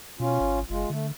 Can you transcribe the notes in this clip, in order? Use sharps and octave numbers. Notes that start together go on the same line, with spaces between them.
B2 C#4 F4
G#1
F#1 G#3 F4
D3 A3